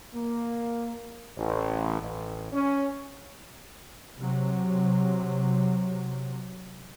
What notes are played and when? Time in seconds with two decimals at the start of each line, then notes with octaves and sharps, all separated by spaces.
0.14 A#3
1.37 A1
2.01 A1
2.53 C#4
4.17 C3 F#3